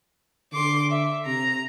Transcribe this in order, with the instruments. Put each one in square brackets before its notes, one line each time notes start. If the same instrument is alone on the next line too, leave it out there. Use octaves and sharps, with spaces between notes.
[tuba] D3 [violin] C6 D6
[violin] E5
[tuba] C3 [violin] A#5